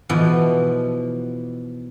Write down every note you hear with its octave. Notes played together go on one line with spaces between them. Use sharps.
B2 E3 F3